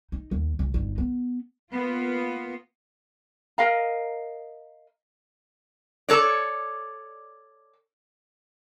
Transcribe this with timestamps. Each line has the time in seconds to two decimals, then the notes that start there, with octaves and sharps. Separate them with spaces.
0.12 D#4
0.31 D#2
0.59 C#2
0.74 G1 D#4
0.98 B3
1.72 A#3 B3 F4
3.58 A#4 D#5 F5 A#5
6.09 A4 C#5 D5